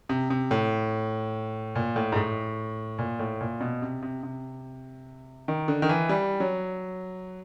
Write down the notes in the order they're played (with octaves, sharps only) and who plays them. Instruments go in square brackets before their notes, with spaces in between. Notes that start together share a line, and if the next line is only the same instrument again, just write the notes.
[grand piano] C3
C3
A2
A#2
A2
G#2
A2
A#2
A2
A#2
B2
C3
C3
C3
D#3
D3
D#3
E3
G3
F#3